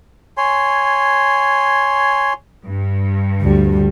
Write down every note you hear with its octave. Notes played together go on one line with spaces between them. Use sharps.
C#5 G#5 C6
G2
D2 G3